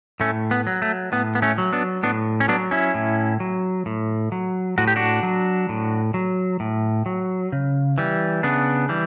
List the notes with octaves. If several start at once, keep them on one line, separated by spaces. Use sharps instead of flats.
A2 A3 C#4
B3
F#3
A3
A2 B3
B3
A3 C#4
F#3
B3 D4
A2 B3 D4
C#4
F#3 B3 D4
C#4 E4
A2
F#3
A2
F#3
A2 F#4
G4
D4 F#4
F#3
A2
F#3
A2
F#3
C#3
E3 G3
C#3 B3 D4
E3 G3